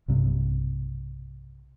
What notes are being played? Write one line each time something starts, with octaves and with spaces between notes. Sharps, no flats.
B1 G2 C3